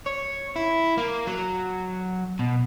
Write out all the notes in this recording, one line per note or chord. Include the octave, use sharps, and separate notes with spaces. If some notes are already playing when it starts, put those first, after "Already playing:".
C#5
E4
A#3
F#3
B2